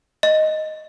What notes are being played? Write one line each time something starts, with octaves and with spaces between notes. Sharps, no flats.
D#5